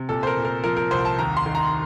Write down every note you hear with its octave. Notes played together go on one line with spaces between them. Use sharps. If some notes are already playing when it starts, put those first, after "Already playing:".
Already playing: C3
A#2 A4
C5
A#4
A#2
A#4
F3 A#4
A#4
C2 C5
A5
D#2 A#5
C6
D#3
A#5